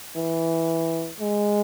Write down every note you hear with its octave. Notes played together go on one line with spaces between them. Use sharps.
E3
G#3